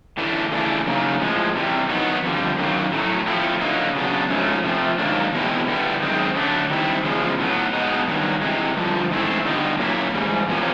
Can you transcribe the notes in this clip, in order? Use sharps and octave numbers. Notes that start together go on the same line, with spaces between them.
A2 E3 A3 D4
C#3 E3 A3 D4
F#2 C#3 F#3 A#3 D#4
A2 F3 G#3
C3 E3 G3
D#3 F#3 B3 D#4
F2 D3 G3
F#2 D#3 F#3 A#3
A2 F#3 A3
A2 F3 A3 C4 E4
D3 F#3 A#3 D#4
C#3 F#3 B3 D4
G#2 F3 A3 C#4
C3 F3 A3
G#2 D#3 F#3 A#3 D4
E2 B2 G#3 C4 E4
G2 D3 G3 B3 E4
F#2 D#3 G#3 C4
D3 F#3 A3 D4
D#3 G3 C4 E4
E2 C#3 F3 G#3
A2 F#3 B3
B2 G#3 B3 D#4
G2 D#3 F#3
C3 E3 G#3
G2 D3 F3
G#2 E3 A3 C4 E4
G2 D3 G3 B3 D#4
A#2 F#3 A#3 C#4 E4
G#2 E3 G3
E2 C3 F3 A#3 C#4